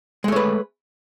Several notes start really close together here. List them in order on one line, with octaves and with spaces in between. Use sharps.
G#3 A3 C#5 B4